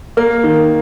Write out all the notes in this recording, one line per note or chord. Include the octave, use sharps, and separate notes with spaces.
A#3 A#4
D#3